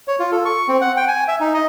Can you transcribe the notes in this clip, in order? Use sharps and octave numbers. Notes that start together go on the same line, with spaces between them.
C#5
F4
A4
C#6
C4
F#5
G5
G#5
E5
D#4
D#5